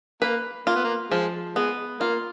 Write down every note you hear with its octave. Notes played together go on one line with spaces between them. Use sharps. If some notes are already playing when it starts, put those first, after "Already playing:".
A#3 B4
A#3 F4
B3
A#3
F3 G#3
G#3 B3
A#3 F4